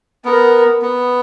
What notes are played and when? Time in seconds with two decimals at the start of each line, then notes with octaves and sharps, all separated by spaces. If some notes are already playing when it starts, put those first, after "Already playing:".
0.25 B3 A#4
0.82 B3